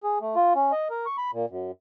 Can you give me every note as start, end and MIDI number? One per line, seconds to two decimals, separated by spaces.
0.03 0.19 68
0.21 0.36 57
0.36 0.53 65
0.55 0.72 61
0.72 0.88 75
0.90 1.06 70
1.06 1.17 85
1.18 1.31 83
1.33 1.46 46
1.50 1.71 42